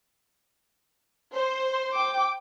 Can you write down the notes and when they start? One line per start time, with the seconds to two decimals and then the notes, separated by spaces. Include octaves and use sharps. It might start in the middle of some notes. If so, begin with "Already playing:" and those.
1.35 C5
1.93 G5 D6